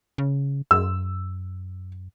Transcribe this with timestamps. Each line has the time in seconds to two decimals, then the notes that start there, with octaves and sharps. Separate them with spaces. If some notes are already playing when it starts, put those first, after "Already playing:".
0.18 C#3
0.71 F#2 E6